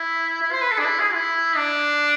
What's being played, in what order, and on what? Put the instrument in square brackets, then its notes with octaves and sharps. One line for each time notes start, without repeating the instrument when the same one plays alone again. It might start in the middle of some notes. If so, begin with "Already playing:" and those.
Already playing: [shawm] E4
E4
C5
B4
A4
D4
E4
G#4
E4
D4